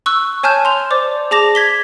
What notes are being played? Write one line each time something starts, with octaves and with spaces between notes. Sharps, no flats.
C#6 E6 F#6
C#5 G#5 A5 F6 G6 E7
C6 F7
C5 D5 D6
G#4 A5 D6 A#6 F7
G#6 B6 G7